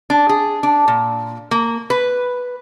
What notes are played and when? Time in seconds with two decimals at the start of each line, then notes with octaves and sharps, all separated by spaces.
0.10 D4
0.29 G#4
0.63 D4
0.88 A#2
1.51 A#3
1.90 B4